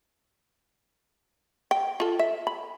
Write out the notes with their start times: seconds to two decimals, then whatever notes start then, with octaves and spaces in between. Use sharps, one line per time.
1.71 G5
2.00 F4 A4
2.19 E5
2.47 B5